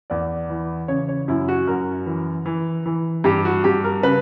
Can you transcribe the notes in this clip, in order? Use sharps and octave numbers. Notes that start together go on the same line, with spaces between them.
E2 D5
E3
C#3 C#5
C#5
F#2 E4
F#4
F#2 A#4
E3
E3
E3
G2 G4
F#4
G2 G4
A#4
C#3 B4